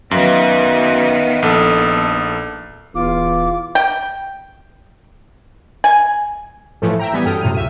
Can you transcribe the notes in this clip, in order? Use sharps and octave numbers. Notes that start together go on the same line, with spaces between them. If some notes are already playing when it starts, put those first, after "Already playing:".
F#2 D#3 B3 B4 E5 F5
A#1 A4 D#6
D#1 E2 F4 D6
G5
G#5
A2 E3 F3 A3
E5 G5 A#5
E3 G3 B3 G#5 B6
F#2 A4 G5 D#6 F6
F#2 A2 C3 F6 D#7
C#2 E5 D#7